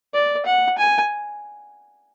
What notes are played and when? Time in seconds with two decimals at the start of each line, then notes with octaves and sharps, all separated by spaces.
0.14 D5
0.46 F#5
0.78 G#5